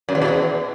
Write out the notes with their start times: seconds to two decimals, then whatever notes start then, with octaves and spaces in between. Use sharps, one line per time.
0.09 F#2
0.15 E2
0.21 B2
0.28 E2